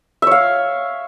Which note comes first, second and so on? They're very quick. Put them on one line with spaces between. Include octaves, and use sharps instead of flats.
E5 C#5 F5